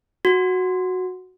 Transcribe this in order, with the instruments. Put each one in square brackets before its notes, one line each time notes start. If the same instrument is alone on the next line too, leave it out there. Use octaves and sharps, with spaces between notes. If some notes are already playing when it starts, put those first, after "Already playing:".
[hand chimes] F#4